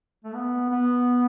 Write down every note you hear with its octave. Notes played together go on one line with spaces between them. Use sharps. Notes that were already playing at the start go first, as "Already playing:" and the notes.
A3
B3
B3